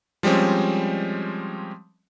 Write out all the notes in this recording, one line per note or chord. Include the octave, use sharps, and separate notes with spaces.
F3 G3 G#3 C4 C#4